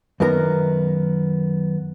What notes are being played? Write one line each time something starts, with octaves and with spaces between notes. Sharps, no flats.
F#2 D#3 B3 A#4 A#5